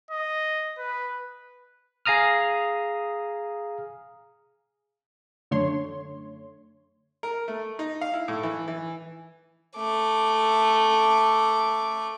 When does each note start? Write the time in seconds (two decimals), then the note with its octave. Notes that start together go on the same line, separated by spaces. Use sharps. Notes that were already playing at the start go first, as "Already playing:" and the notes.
0.11 D#5
0.78 B4
2.05 G#4 F5 A#5 D#6 F6
5.51 F#2 D3 A3 C#5 C6
7.23 A#4
7.48 A3
7.79 D#4
8.01 F5
8.14 E4
8.28 A2
8.43 E3
8.68 E3
9.77 A3 D6